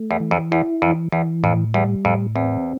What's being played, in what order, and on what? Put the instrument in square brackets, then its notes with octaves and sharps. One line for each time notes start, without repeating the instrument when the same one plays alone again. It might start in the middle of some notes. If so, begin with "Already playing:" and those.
Already playing: [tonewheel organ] A3
[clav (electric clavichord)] E2
[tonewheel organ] E3
[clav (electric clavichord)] F2
[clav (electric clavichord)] E2 [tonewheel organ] E4
[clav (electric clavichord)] F2 [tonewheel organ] E3
[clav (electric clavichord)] E2 [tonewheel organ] E3
[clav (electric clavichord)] F2 [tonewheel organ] A2
[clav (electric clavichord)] E2 [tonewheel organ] G3
[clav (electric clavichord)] F2 [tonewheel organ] A2
[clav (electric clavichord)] E2 [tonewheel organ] C4